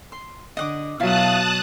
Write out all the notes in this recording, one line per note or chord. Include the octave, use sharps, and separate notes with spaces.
C6
D3 D#5 F#5 D6
B2 F#3 E4 F4 F5 A5 D#6 F#6